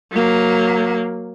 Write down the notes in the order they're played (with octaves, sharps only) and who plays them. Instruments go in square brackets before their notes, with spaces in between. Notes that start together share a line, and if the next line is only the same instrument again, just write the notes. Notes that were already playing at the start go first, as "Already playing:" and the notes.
[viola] F#3 A#3